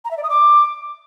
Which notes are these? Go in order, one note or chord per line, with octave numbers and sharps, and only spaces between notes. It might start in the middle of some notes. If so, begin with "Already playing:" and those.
A#5
E5
D5
D#6
D6